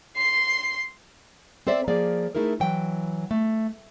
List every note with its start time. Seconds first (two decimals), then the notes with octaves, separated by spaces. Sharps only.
0.16 C6 C7
1.67 C4 A4 C5 D5 E5
1.88 F3 A#3 G#4 D5
2.35 A3 D#4 E4 G#4 A#4
2.60 E3 F#3 G5
3.31 A3